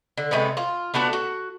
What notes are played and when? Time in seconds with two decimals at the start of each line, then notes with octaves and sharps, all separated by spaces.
0.17 D3
0.31 C3 G#3 A3 B3
0.57 F4
0.94 A3 B3 D4 F#4
1.13 F#4